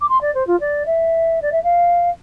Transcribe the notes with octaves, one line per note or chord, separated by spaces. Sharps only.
D6
C6
D5
C5
F4
D5
E5
D5
E5
F5